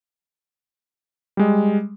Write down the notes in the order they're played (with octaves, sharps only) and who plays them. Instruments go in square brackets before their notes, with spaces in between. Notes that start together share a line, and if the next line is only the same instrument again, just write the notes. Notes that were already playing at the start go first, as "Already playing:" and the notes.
[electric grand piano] G3 G#3 D#5